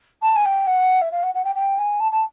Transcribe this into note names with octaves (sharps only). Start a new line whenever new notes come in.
A5
G#5
G5
F#5
E5
F5
F#5
F#5
G5
G5
G#5
A5
A5